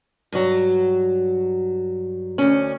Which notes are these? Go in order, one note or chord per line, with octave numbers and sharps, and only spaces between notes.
G2 F#3
D2 C#4